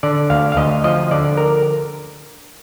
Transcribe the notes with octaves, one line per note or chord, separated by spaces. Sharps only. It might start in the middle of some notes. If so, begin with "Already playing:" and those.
D3 D5
D2 F5
F5
D2 D#5
F3 D#5
D3 D5
A#4